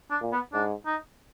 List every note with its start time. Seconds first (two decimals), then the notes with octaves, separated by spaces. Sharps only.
0.11 D4
0.21 A#2
0.32 B3
0.53 G#2 D4
0.86 D#4